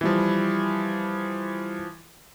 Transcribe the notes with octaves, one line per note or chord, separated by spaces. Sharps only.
E3 F3 G3 E4